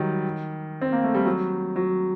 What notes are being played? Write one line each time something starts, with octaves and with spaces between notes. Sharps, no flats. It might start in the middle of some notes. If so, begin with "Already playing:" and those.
Already playing: D#3 F#3 G3
C4
A#3
A3
G3
F#3
F#3